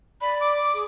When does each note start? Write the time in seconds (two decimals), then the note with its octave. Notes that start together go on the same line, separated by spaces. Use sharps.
0.21 D5 B5
0.40 D6
0.74 G#4